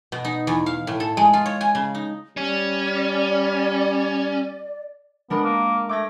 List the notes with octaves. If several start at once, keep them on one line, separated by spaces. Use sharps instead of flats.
B2
D#4
E2
F5
A2
A4
G#3
F4
C#5
G#5
C#3
D#4
G3 C#4 D5
G#3 B3 D4 A#4
A#3
A3 D6 G#6 A#6